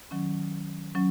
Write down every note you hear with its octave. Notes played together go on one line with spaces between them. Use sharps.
D#3 F#3 C#4
F#3 C#4